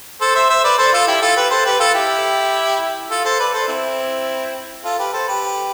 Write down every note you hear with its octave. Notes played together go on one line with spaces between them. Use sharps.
A4 C5
C5 E5
C5 E5
B4 D5
A4 C5
F4 A4
E4 G4
F4 A4
G4 B4
A4 C5
G4 B4
F4 A4
E4 G4
F4 A4
A4 C5
B4 D5
A4 C5
C4 E4
F4 A4
G4 B4
A4 C5
G4 B4